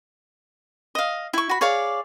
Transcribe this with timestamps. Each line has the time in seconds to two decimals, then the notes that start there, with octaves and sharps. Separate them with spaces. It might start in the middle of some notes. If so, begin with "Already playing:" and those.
0.95 D#5 F5
1.33 E4 C#6
1.49 F#4 B5
1.61 G#4 C#5 D5 F5